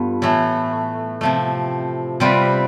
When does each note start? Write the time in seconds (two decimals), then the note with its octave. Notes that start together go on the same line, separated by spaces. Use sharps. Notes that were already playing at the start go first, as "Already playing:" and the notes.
Already playing: G2 B3 F4 A4
0.22 A2 E3 A3
1.21 C3 F3 A3
2.20 C3 G3 C4 F4 B4